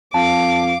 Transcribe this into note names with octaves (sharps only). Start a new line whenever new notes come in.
F2 F5 A5 D6